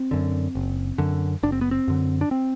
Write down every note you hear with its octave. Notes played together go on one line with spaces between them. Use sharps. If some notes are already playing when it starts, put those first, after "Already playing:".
Already playing: C4
F#2 D3
F#1
F#2 D3
F#1 D4
C4
B3
C4
F#2 D3
D4
C4